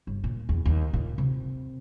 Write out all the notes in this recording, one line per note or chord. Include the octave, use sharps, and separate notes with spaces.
G1
A#2
E2
D#2
A#2
C3